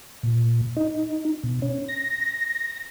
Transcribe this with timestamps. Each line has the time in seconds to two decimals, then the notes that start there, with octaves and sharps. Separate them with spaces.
0.23 A#2
0.77 D#4
1.44 B2
1.62 C#4
1.88 A#6